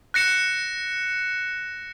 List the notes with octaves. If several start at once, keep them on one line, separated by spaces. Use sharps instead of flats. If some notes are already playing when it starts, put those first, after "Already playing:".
F#6 A#6 C#7 E7